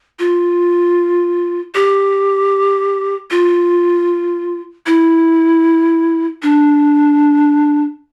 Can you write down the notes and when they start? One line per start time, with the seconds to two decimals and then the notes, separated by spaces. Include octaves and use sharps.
0.19 F4
1.75 G4
3.31 F4
4.86 E4
6.42 D4